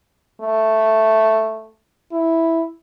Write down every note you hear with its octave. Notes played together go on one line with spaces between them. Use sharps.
A3
E4